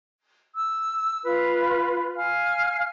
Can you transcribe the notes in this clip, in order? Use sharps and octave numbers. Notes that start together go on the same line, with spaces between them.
E6
F4 B4
F5 G#5 F6